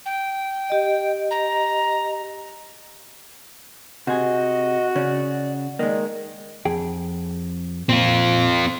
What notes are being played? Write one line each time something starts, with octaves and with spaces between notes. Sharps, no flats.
G5
G4 D#5
A#5
C3 F#4 G#4 D#5
C#3 C#4 D5
D#3 G#3 A#3 D5
F2 G#4 G5
A#2 C4 F4